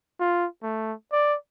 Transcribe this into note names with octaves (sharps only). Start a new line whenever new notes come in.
F4
A3
D5